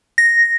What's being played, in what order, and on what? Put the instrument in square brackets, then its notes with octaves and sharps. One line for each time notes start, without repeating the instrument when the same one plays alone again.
[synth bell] A#6